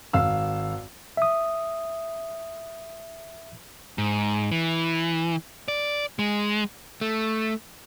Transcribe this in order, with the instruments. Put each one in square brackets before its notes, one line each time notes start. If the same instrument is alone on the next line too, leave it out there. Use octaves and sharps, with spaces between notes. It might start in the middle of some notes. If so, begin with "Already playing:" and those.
[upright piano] G#1 F5 E6
[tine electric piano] E5 D#6
[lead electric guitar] G#2
E3
D5
G#3
[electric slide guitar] A3